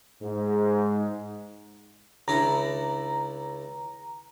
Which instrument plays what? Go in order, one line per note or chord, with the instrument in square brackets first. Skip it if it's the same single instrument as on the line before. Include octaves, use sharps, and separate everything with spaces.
[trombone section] G#2
[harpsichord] C#2 D4 E4 [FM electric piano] A#5